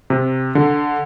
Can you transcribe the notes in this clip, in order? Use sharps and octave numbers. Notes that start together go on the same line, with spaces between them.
C3
D3